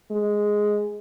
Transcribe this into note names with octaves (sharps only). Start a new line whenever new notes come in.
G#3